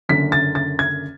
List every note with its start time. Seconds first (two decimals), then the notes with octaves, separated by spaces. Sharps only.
0.09 F#1 F#2 D3 B6
0.32 A6
0.55 A6
0.79 G#6